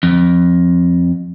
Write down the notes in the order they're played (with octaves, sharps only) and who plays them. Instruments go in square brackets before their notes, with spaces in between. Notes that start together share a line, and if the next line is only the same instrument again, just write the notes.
[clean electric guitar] F2